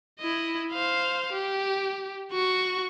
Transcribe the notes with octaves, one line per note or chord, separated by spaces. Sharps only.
E4 D#5
C5 F5
G4
F#4 C#6